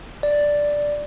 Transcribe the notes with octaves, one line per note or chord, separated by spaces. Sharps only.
D5